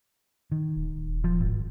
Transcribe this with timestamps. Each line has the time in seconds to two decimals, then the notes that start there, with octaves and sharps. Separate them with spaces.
0.52 D#3
0.76 D#1
0.96 D#1
1.24 F3
1.40 G#1